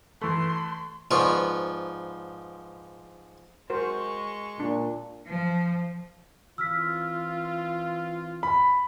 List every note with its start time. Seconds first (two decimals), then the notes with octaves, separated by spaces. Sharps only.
0.21 E3 A3 C6
1.11 G#2 F3 B3 F4 D5 C#6
3.70 G#3 F#4 A#4 C5 C#6
4.60 A#2 D4
5.27 F3
6.58 E3 C4 F4 E6 F6 B6
8.43 B5